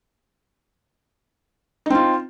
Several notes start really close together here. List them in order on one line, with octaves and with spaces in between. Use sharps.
D#4 C4 F4